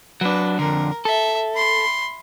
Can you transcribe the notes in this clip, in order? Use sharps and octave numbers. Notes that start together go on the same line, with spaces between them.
F#3 D4 B4
F2 D3 A#4
A4 E5
B5 C6